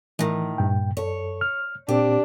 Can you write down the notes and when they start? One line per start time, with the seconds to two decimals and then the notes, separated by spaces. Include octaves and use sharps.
0.19 A2 D#3 E3
0.58 G2 A#2 G5
0.97 F#2 A4 C#5
1.41 F6
1.89 A#2 C4 D4 G4